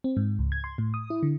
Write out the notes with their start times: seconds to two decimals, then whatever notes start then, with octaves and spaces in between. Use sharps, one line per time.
0.04 C4
0.17 G#2
0.39 C#2
0.52 G#6
0.64 C6
0.78 A2
0.94 D#6
1.10 E4
1.23 D3